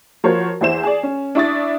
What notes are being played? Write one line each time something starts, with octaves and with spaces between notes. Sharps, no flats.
F3 F#4 A#4 C5 C#5
E2 E4 C5 E7
G#4 D5
C#4
D4 E4 C#6 D#6 A6